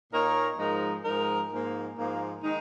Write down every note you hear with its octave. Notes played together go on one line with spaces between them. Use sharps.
A#2 A#3 D#4 A#4 C#5
G#2 F3 G#3 D#4 A#4
G#2 F3 G#3 D#4 A#4
G#2 F3 A#3
G#2 F3 A#3
D#3 G#3 D#4